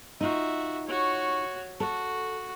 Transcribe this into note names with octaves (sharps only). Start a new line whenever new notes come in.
D#4 F4 F#4 E5
F#4 C#5
F#4 A4